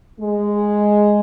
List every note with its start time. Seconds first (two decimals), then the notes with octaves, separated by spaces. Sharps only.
0.20 G#3